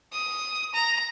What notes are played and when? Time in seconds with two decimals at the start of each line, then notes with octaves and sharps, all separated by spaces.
0.12 D#6
0.74 A#5